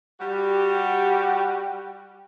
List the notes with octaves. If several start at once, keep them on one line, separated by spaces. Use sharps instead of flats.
G3 F#4 G4